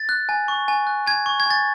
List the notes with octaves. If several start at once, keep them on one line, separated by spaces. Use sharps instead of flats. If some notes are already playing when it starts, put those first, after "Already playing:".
Already playing: A6
F#6
G#5
C#6
G#5
F#6
G#5 G#6
C#6
G#6
G#5 A6